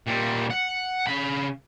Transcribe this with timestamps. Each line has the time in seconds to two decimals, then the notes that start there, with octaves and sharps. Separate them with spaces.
0.07 A#2 G3
0.50 F#5
1.07 C#3 B5